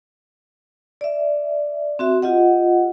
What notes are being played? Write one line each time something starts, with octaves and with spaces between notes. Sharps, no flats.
D5 E5
C4 F#4 E5
F4 G4 D#5 F#5